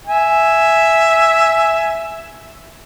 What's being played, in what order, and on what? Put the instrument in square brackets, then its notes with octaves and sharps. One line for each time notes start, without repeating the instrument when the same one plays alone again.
[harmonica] E5 G#5